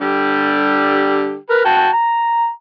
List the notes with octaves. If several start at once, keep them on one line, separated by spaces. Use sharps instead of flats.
D3 G3 G4
A#4 B4
F#4 G5 A5
A#5